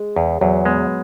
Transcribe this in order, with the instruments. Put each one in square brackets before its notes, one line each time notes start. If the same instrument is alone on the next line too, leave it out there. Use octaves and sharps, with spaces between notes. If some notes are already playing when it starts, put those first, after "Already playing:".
Already playing: [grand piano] G#3
[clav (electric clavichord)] E2
[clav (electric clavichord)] E2 [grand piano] F#3
[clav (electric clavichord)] G#3 [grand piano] B3